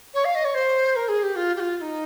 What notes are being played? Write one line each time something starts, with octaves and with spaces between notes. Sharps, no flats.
C#5
F5
D#5
C#5
C5
A#4
G#4
G4
F4
G4
F4
F4
D#4